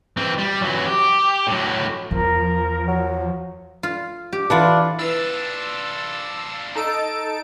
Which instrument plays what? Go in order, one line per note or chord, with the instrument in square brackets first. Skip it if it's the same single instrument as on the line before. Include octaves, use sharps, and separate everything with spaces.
[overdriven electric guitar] E3 C4
G3
E3 F#3
G4
A2 F#3
[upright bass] E2 [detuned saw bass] F3 [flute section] A#4
[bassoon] F#3
[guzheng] F4
G4
[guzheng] E3 E4 F#5 [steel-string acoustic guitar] D4 F4
[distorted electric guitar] D4 F4 [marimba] E4 B4 [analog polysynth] E6 A6
[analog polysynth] D#4 A5 D7 [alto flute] A4